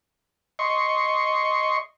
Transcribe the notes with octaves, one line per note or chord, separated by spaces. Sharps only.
D#5 C6 C#6